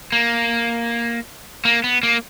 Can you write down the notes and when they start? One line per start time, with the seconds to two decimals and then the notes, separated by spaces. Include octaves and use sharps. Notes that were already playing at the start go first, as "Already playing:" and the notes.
0.12 A#3
1.65 A#3
1.84 B3
2.03 A#3